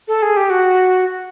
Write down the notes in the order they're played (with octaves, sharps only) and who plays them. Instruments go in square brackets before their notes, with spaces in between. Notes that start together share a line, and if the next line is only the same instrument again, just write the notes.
[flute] A4
G#4
G4
F#4